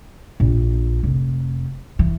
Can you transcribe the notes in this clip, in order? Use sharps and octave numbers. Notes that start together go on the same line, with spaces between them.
A#1
F1
E3